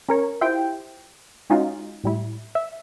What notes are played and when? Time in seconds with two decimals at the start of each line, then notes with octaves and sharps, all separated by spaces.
0.09 C#4 A#4 C#5
0.41 E4 F4 G4 C5 G5
1.50 G#3 C#4 D#4 F4 F#4
2.04 A2 G3 E4
2.55 E5